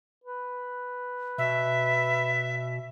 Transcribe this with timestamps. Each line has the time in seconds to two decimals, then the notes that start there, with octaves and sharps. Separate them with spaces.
0.24 B4
1.38 B2 E5